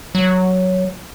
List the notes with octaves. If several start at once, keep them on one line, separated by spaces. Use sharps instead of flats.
F#3